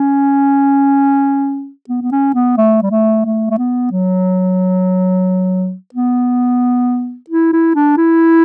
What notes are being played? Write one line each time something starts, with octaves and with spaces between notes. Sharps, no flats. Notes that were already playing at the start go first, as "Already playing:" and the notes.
Already playing: C#4
B3
B3
C#4
B3
A3
G3
A3
A3
A3
B3
F#3
B3
E4
E4
D4
E4